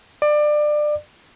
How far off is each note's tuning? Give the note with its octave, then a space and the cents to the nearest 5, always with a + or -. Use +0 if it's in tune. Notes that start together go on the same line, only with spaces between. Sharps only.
D5 +25